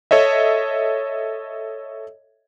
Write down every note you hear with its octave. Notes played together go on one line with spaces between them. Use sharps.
A4 C#5 D#5 E5